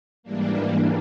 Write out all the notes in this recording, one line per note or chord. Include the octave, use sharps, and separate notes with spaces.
G#2 E3 G3 A#3 D4